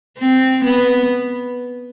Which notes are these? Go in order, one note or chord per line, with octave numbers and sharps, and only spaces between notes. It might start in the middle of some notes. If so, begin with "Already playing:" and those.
C4
B3